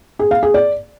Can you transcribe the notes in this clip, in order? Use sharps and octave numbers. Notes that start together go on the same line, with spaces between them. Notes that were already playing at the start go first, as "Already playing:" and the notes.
G#4
F5
G#4
D5